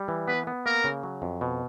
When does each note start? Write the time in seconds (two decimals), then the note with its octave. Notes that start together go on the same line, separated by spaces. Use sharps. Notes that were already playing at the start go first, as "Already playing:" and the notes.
Already playing: G3
0.08 E3
0.28 B3 B4
0.47 B3
0.66 A#3 A#4
0.84 C#3
1.03 F#3
1.22 F2
1.41 B2